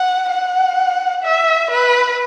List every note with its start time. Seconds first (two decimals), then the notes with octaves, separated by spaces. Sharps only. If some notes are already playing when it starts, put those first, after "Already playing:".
Already playing: F#5
0.30 F#5
1.23 E5
1.71 B4